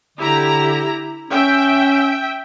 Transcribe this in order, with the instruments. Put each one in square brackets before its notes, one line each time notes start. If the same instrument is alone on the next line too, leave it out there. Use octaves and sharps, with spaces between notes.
[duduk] D3 [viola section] E4 G4 A#5
[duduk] C#4 [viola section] E5 G5